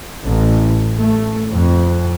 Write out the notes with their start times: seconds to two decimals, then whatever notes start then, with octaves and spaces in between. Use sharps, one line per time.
0.24 A1
0.97 A3
1.53 F2